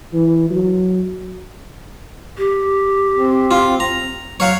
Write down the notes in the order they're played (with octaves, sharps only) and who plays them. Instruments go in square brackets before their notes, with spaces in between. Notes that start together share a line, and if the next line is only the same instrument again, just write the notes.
[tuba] E3
F#3
[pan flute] G4
[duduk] C4
[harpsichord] F4
A#5
[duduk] F#3 [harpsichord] C#5 F5 F#5